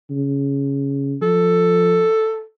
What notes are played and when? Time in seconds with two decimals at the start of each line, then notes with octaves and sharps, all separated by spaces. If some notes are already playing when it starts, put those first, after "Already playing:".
0.11 C#3
1.22 F3 A4